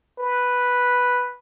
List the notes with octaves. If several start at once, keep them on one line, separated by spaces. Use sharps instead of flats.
B4